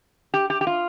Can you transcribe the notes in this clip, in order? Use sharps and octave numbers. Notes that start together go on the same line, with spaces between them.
G4
G4
G4
F4